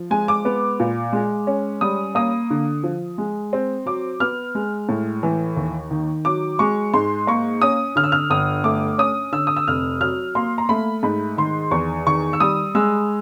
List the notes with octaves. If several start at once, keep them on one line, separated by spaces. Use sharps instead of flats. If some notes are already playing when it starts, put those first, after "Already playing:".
Already playing: F3
G#3 G#5
D6
B3
A#2
G#3
C#4
G3 D#6
A#3 D#6
D3
F3
G#3
C4
F#3 D6
B3 F6
G#3
A2
E3
D#2
D#3
F#3 D6
G#3 C#6
G#2 C6
A#3 C#6
C#4 D#6
D3 F6
E6
F6
G1 D#6
A3 D6
C#4 D#6
D3 E6
D#6
E6
F1 F6
F#3 F6
A#3 C6
A#5
A3 B5
G#2 B5
D#3 C6
E2 C#6
D#3 C#6
E6
G3 D#6
G#3 E6